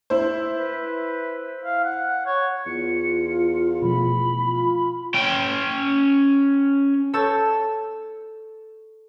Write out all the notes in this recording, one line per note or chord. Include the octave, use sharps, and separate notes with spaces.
E4 C5
B4
F5
F#5
C#5
E2 F4 C#7
B2 F3 A3 B5
F4
C#4 G5
A4 C#5 A5 E6 G6